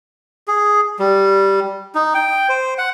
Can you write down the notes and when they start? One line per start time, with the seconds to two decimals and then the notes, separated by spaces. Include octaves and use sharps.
0.48 G#4
0.99 G3
1.95 D#4
2.14 G5
2.49 C5
2.78 F#5